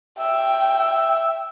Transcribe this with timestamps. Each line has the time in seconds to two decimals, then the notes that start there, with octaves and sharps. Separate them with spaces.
0.19 E5 G5